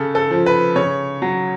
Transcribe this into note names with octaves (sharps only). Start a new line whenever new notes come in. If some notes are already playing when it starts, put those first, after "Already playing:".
Already playing: C#3 A4
A4
F3
B4
C#3 C#5
F#3